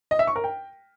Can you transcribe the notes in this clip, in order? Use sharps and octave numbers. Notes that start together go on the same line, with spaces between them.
D#5
E5
C#6
A#4
G5